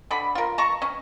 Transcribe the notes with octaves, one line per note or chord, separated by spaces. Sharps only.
D3 A4 B5
F4 A#4
A5 A#5 C#6
C#4